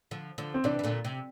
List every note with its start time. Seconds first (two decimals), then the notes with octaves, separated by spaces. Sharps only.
0.11 D3 F3
0.38 D3 F3
0.54 C4
0.64 C3 E3 D4
0.79 E3
0.84 A#2 D3
1.05 C3